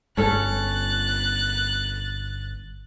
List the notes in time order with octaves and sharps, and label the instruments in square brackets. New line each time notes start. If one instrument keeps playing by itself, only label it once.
[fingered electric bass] G1 [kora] C#4 A4 C#5 [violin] F#6 A6